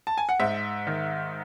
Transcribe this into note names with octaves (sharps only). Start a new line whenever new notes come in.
A5
G#5
F#5
G#2 E5
D#3